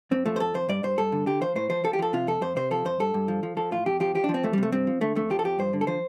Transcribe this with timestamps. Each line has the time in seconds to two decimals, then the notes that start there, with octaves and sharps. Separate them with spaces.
0.11 F2 C4
0.26 F3 A3
0.36 C5
0.40 F2 A4
0.54 F2 C5
0.69 G2 D5
0.83 G2 C5
0.98 G2 A4
1.12 D3
1.26 D3 G4
1.41 F3 C5
1.56 A2 C5
1.70 F3 C5
1.84 F3 A4
1.93 G4
1.99 F3 A4
2.13 C3 F4
2.27 F2 A4
2.42 F2 C5
2.56 C3 C5
2.71 F3 A4
2.85 F2 C5
3.00 G2 A4
3.14 G2
3.28 F3
3.43 F3
3.57 F3 A4
3.71 A2 F4
3.86 F2 G4
4.00 F3 G4
4.15 F3 G4
4.24 D4
4.29 F3
4.34 C4
4.43 F2 A3
4.53 G3
4.58 C3 A3
4.72 G2 C4
4.87 F3
5.01 D3 A3
5.15 F2 A3
5.30 F3 G4
5.39 A4
5.44 F2 G4
5.59 G2 C5
5.73 D3
5.81 A4
5.87 F3 C5